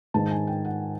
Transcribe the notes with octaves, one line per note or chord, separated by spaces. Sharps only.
G#2 D#3 G#3 A5
G#5
G5
F#5